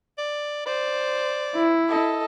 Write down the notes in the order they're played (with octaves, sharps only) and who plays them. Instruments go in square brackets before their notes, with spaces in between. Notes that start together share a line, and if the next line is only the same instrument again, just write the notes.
[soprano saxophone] D5
[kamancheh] C5 [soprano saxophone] D5
[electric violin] E4
[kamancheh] A4 D#5